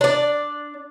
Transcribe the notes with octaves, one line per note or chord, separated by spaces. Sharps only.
D4 D5